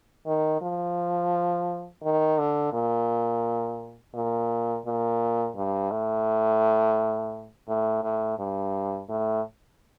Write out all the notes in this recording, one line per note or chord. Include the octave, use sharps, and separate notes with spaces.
D#3
F3
D#3
D3
A#2
A#2
A#2
G2
A2
A2
A2
G2
A2